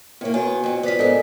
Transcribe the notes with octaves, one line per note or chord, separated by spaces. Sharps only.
A2 A#3 B3 C#5
B3 F#4 C#5 G#5
F2 A#2
F3 B3 D5 B6
G#2 D4 A4 A#4 D#5